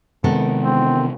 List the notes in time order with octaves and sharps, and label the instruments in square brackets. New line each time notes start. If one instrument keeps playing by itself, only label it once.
[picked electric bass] C3 G#3 [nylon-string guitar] D#3 B3 A4
[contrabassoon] E1 [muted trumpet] C4